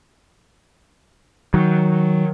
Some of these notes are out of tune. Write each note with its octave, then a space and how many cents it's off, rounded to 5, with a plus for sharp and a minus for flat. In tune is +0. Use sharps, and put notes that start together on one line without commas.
D#3 +15 F#3 +0